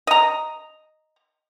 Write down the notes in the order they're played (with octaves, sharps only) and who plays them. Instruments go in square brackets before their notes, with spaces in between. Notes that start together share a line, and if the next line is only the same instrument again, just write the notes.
[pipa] D#5 A#5